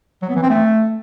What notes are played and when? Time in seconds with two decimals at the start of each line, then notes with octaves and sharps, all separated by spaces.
0.22 F#3
0.29 B3
0.36 E3
0.43 C4
0.50 A3